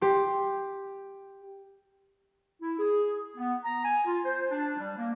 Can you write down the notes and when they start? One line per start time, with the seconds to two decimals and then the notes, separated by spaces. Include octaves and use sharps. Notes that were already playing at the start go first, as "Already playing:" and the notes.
0.01 G4 C6
2.61 E4
2.79 G#4
3.36 B3
3.64 A#5
3.83 G#5
4.05 F4
4.24 C5
4.49 D4
4.77 G3
4.98 A#3